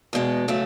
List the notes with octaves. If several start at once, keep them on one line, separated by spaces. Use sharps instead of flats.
E2 B2 G#3
C#3 F#3 A3 C#4